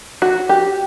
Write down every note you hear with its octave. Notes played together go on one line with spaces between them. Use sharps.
F#4
G4